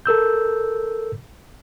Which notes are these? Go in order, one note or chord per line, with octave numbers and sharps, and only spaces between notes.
A4 A#4 E6 G6